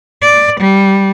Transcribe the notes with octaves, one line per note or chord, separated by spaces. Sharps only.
D5
G3